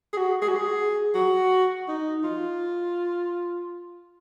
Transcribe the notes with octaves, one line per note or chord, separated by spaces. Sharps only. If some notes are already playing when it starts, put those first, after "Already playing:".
G#4
F#4
G#4
F#4
G#4
F#4
D#4
F4